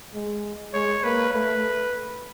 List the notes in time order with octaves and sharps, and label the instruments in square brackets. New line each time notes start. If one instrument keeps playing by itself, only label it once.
[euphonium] G#3
[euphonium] G#3 [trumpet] C#5
[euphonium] A#3 [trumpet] B4
[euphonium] A3 [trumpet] B4